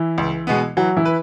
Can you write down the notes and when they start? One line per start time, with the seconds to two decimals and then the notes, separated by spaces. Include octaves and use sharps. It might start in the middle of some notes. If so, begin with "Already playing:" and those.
Already playing: E3 E4
0.18 C#2
0.47 B2 G#3 B3
0.77 E3 F#3 F#4
0.97 E3 E4
1.05 B4